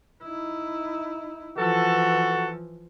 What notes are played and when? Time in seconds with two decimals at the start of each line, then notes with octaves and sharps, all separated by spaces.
0.24 D#4 E4
1.58 E3 F3 F#4 A4